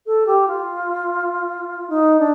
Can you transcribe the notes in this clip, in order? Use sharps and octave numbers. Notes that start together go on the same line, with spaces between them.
A4
G4
F4
D#4
D4